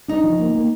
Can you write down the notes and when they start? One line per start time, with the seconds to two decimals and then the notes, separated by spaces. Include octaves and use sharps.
0.08 D4 D#4
0.24 F3
0.40 A#3
0.55 A#3